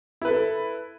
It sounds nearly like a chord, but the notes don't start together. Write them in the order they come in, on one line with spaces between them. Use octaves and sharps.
E4 B4 A4